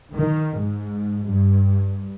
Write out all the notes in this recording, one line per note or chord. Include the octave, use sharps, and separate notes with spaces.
D#3
G#2
G2